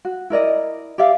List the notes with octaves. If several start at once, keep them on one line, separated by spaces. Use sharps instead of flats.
F#4
E4 A#4 D5 D#5
G4 D5 E5 F5